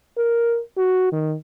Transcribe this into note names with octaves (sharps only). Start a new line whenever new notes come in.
A#4
F#4
D#3